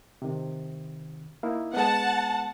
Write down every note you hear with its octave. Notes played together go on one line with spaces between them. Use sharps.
C3 D#3
A#3 D#4 E4
G#3 B3 F#5 A5